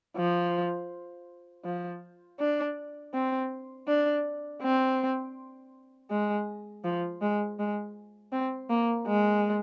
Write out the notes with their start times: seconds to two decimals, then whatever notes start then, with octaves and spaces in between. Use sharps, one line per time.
0.17 F3
1.65 F3
2.40 D4
3.14 C4
3.88 D4
4.62 C4
6.11 G#3
6.84 F3
7.22 G#3
7.59 G#3
8.32 C4
8.70 A#3
9.07 G#3